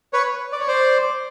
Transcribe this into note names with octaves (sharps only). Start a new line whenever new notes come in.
B4 C#5
D5
C#5
C5 D5